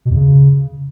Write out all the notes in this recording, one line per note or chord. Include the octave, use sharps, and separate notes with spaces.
B2
E2
C#3